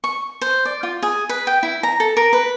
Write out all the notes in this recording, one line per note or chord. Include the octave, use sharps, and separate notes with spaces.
C#6
C5
D5
F4
G#4
B4
G5
E4
A#5
A4
A#4
B4